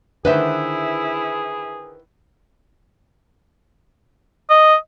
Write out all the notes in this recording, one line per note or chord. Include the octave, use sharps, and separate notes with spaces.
D3 D#3 E4 G#4 B4 C5 E5
D#5